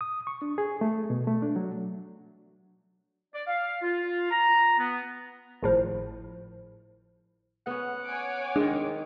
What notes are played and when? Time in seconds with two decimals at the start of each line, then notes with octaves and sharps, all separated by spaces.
0.01 D#6
0.27 C#6
0.42 D4
0.58 G#4
0.81 A3
1.10 B2
1.27 A3
1.42 D4
1.56 F#3
3.34 D5
3.47 F5
3.82 F4
4.31 A#5
4.78 B3
5.63 G#1 A2 F3
7.67 B3 C#4 F#5
8.05 C#5 G#5 D6
8.56 D#3 G#3 D4